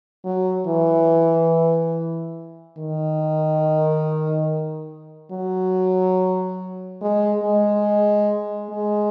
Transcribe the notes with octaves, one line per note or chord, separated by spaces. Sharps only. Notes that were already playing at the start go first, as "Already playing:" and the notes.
F#3
E3
D#3
F#3
G#3
G#3
G#3